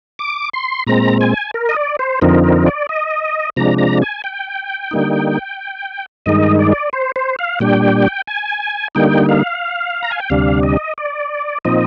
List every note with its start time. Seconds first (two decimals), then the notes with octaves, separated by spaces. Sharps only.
0.19 D6
0.53 C6
0.87 A#2 G#3 C4 A#5
1.21 G#5
1.54 A#4
1.69 D#5
1.76 D5
1.99 C5
2.21 F2 D3 F3 C4 D#4 A#4
2.44 A#4
2.66 D5
2.89 D#5
3.56 C3 F3 G#3 D4 A#5
3.78 A#5
4.02 G#5
4.24 G5
4.91 D3 G3 A#3 D#4
6.26 G2 D#3 G#3 D#4 D#5
6.59 D5
6.93 C5
7.16 C5
7.39 F5
7.60 A#2 G3 D4 G5
8.27 G#5
8.95 D3 G3 A#3 D#4 G5
9.29 F5
10.03 A#5
10.11 G#5
10.20 G5
10.30 D2 C3 G3 D4 F5
10.63 D#5
10.98 D5
11.65 A#2 F3 C4 D#4 D#5